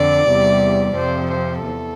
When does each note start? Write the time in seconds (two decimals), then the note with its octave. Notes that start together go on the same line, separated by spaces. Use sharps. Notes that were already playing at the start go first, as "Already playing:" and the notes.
Already playing: F2 D3 D5
0.27 E2 C3 G3
0.96 F2 C3 F3 C5
1.30 C5
1.64 E2 A4